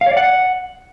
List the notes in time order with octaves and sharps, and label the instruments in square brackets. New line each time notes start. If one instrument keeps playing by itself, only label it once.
[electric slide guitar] F5
C#5
D5
F#5